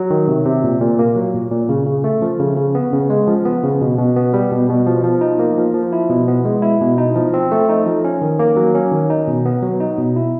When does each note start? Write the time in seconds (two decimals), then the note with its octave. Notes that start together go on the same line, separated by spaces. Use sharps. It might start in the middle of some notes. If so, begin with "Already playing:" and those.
Already playing: F#3
0.10 D#3
0.28 C3
0.45 C3
0.64 A#2
0.81 A#2
0.99 A#3
1.16 F#3
1.34 A#2
1.51 A#2
1.69 C#3
1.87 C#3
2.04 A3
2.22 F3
2.40 C#3
2.57 C#3
2.75 B3
2.92 C#3
3.10 G#3
3.28 F3
3.45 B3
3.63 C#3
3.81 B2
3.98 B2
4.16 B3
4.33 G3
4.51 B2
4.69 B2
4.87 F3
5.04 F3
5.21 D#4
5.39 A#3
5.57 F3
5.74 F3
5.92 E4
6.09 B2
6.28 B3
6.45 G#3
6.62 E4
6.81 B2
6.98 D#4
7.15 F3
7.34 C4
7.51 A3
7.69 D#4
7.86 F3
8.04 C#4
8.22 D#3
8.39 A#3
8.57 F#3
8.75 C#4
8.92 D#3
9.10 D#4
9.28 B2
9.46 B3
9.63 F#3
9.80 D#4
9.98 B2
10.16 E4